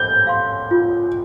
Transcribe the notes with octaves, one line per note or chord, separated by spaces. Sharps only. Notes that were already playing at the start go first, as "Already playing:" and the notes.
Already playing: C5 G6
F5 C6
F4